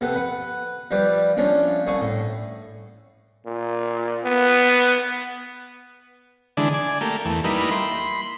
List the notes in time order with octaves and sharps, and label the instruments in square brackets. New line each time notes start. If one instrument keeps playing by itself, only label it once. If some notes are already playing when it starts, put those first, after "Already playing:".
[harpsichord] C3 B3 A4 B4
B4 F#5
F3 G3 G4 B4 D6
F3 A3 C#4 D4
C2 G#4 A5 C#6 D#6
A2
[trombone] A#2
B3
[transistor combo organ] D3 E3 G#3 D4
D5 G#5
A3 A#3 G4
E2 A3
G3 A#3 D#4 E4 B4
B5 C6